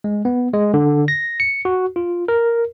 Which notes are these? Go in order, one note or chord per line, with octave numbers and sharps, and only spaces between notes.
G#3
B3
G#3
D3
A#6
C#7
F#4
F4
A#4